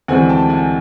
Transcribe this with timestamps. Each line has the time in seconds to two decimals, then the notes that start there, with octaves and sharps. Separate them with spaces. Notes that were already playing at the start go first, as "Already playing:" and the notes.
0.08 D2 C3 E3 G#3 C4 F#5 G#5
0.29 G5 A5
0.49 F#5 G#5